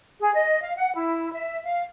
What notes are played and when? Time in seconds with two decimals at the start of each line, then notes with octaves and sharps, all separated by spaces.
0.21 G#4
0.36 D#5
0.63 F5
0.77 F#5
0.95 E4
1.34 E5
1.64 F5